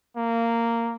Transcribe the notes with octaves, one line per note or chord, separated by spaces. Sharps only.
A#3